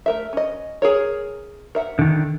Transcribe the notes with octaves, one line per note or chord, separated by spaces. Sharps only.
A3 A#4 E5
C#4 D#5
G#4 A#4 C#5
A#4 E5 F#5
D3 D#3